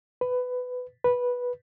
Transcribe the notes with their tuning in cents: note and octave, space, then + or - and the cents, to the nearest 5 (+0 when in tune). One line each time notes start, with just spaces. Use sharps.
B4 +15
B4 -10